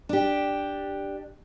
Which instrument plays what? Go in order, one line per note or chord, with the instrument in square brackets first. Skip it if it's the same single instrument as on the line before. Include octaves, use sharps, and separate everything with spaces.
[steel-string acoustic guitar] D4 G4